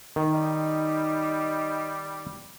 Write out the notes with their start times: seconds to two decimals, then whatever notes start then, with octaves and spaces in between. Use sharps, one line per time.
0.16 D#3
0.33 G3 D#4